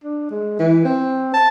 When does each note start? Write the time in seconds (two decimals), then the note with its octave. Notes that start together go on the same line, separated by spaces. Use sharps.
0.04 D4
0.30 G#3
0.59 E3
0.85 C4
1.34 A5